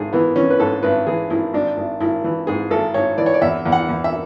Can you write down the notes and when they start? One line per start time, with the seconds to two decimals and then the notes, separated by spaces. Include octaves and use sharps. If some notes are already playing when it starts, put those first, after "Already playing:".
Already playing: G#1 G#2 G#4
0.13 E3 B3
0.36 E3 C#4
0.50 B4
0.60 G#2 A4
0.83 G#1 B4
1.07 E3 G#4
1.30 G#1 E4
1.53 G#1 D4
1.77 G#1
2.00 G#1 E4
2.24 E3
2.47 G#2 G#4
2.71 G#1 A4
2.94 G#1 C#5
3.18 E3 D5
3.26 C#5
3.34 D5
3.41 E2 E5
3.66 E2
3.72 F#5
3.89 E2
4.04 E5